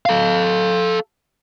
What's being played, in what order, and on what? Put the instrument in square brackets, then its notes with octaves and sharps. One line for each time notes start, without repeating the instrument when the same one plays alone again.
[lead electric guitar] A4 F5